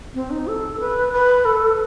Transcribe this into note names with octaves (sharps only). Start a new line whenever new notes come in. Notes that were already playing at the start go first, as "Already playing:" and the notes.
C4
D#4
A4
B4
B4
A4